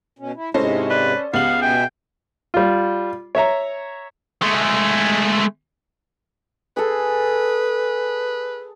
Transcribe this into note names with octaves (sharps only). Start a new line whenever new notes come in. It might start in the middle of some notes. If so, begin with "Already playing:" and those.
B2 C#4
E4
G#2 C3 G#3 C#4 E4 A4 C5 D#5
B4 D5
C#2 B3 G4 F5 F#5 C7 F#7
B2 E5 G5 G#5
G3 F4
C#5 E5 A#5
G#3 A3
G#4 A4 B4